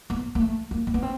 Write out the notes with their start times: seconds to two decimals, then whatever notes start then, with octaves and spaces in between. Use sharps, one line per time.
0.10 B3
0.35 A#3
0.41 A3
0.71 A#3
0.87 A#3
0.94 B3
1.03 C4